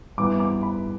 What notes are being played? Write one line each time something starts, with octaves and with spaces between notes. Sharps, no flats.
G2 E3 B3 D6
D6
B5